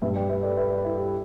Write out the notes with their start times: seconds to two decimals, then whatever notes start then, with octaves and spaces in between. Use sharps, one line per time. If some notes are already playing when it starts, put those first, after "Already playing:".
0.02 G2 G3 B4 E5
0.16 D5 G5
0.29 B4 E5
0.43 A4 D5
0.57 B4 E5
0.71 A4 D5
0.84 E4
0.98 G4